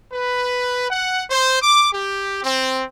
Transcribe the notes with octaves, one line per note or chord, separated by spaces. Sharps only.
B4
F#5
C5
D6
G4
C4